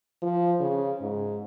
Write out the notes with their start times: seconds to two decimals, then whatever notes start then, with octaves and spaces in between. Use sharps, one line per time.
0.23 F3
0.60 C#3
1.02 G#2